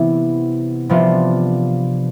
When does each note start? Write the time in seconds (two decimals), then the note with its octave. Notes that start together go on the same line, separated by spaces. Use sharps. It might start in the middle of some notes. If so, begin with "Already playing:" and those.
Already playing: C3 E3 B3 E4
0.89 C3 F3 B3 D4 F4